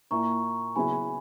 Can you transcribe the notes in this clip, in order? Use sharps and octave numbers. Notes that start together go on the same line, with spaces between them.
A#2 A#3 E4 A#5 C#6
C#3 F#3 B3 E4 G#4 G#5 B5